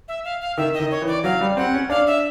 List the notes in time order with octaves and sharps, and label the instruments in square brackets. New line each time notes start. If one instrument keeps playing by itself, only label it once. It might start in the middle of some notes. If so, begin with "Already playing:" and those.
[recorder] E5
F5
F5
[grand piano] D#3 [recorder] E5
[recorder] D#5
[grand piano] D#3
[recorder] C#5
[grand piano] E3
[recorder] D5
[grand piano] F#3 [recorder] F5
[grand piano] G3
[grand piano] C4 [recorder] F#5
[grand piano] C#4
[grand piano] D4 [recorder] F5
[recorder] E5